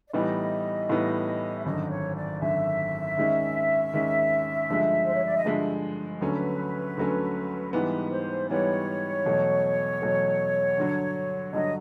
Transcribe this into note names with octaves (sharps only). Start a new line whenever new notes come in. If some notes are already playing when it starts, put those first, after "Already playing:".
D5
A2 E3 G3 B3 D#4 D#5
A2 E3 G3 B3 D#4
E5
G#1 F#2 D3 D#5
C#5
D5
G#1 F#2 D3 E5
D#2 D#3 G#3 C#4
D#2 D#3 G#3 C#4
G2 D3 F3 G#3
C5
C#5
D5
D#5
G2 D3 F3 G#3 E5
D2 D3 F#3 A3 C#4 B4
D2 D3 F#3 A3 C#4
G#2 E3 G3 B3 B4
C5
G#2 E3 G3 B3 C#5
E2 B2 F#3 A3
E2 B2 F#3 A3
G2 D3 F#3
G2 D3 F#3 D#5